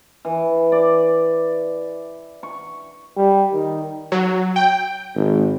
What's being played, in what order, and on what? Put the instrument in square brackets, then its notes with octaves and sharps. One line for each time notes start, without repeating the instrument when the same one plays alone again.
[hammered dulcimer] E3
D5
C#6
[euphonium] G3
D#3
[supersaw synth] F#3
G5
[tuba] G#1